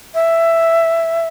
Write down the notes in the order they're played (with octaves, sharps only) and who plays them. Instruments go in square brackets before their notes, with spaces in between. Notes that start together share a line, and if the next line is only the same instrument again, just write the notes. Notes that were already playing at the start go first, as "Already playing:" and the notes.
[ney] E5